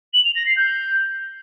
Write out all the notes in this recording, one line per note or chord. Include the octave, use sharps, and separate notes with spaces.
F#7
F7
A#6
C7
G6